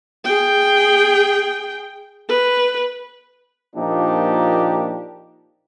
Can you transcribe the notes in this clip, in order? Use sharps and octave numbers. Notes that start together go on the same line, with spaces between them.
G#4 G5
B4
A#2 F3 A#3 D4 D#4 G4